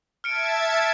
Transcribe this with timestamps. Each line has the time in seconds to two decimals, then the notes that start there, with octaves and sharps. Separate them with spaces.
0.24 E5 A5 F6 G#6 C#7 D7